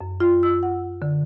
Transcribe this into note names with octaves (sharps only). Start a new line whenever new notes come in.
F#2
F4
E6
F#5
D3